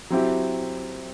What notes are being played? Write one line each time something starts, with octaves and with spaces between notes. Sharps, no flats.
F#3 C4 E4 G4